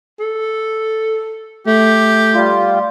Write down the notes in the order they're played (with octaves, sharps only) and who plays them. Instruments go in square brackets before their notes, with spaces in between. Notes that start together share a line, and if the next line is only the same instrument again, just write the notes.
[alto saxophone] A4
[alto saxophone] A3 [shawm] G4
[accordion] G3 F4